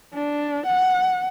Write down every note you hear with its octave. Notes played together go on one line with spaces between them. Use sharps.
D4
F#5